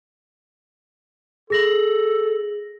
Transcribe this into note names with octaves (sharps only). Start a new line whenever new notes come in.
G#4 A4 A#6 F#7